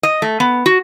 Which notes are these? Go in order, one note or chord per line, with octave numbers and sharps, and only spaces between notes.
D#5
A3
B3
F#4